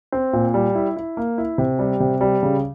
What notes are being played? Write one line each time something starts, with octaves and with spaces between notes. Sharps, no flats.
C4
A#2
G3
E4
E4
A#3
E4
C3
G3
C3
G3
C#3